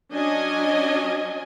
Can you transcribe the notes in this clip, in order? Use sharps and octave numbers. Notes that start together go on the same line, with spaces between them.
F#3 C#4 D4 D#5 G#5